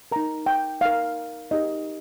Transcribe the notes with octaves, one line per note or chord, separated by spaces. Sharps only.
D#4 A#4 A#5
G5
D#4 A#4 F5
D#4 G4 A#4 D#5